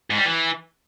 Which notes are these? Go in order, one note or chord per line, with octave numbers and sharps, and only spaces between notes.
G#2
G3
E3